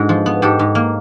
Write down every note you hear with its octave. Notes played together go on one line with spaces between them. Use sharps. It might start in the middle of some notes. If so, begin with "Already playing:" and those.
Already playing: G#2 G#3 D4 F#4 G#4
F3
B3
G#2 G4 A4
G#2
A#3